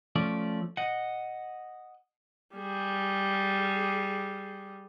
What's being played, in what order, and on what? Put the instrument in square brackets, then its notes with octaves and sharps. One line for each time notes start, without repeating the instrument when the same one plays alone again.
[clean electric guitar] F3 A3 C#4 D5
D#5 F#5
[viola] G3 G#4